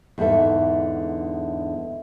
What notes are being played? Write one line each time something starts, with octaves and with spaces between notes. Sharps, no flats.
E2 G#2 D3 A4 E5